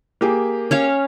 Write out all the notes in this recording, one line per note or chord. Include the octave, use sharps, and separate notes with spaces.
A#3 G4 G#4
C#4 C#5 F5